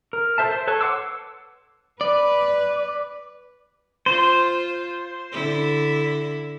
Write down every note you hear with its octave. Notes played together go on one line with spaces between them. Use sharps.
A#4
A4 C5 E5 A5
C5
A4 B4 C#5 A5
F#5 C6 D6 E6
B4 D5
F4 C5
D3 E4